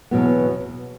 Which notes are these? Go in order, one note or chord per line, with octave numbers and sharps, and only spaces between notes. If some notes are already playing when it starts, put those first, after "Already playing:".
E2 B2 F#3 B3